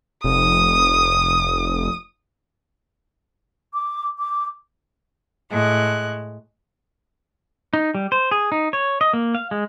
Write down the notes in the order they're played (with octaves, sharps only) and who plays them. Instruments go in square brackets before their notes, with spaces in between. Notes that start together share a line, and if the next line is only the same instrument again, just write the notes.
[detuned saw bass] F1 [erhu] D#6
[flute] D6
D6
[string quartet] A2 G#3 F#6
[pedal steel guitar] D#4
G3
C5
G#4
D#4
C#5
D#5
A#3
F5
G#3